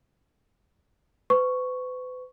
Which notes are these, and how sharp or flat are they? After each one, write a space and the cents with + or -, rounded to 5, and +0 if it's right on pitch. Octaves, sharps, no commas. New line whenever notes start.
B4 +40 C#6 +0